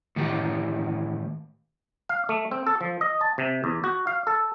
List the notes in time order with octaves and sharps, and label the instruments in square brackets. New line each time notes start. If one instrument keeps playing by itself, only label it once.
[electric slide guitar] A2 D#3 E3 G4
[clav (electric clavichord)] F5
A3
C4
A4
F3
D#5
A5
C3
E2
F#4
F5
A4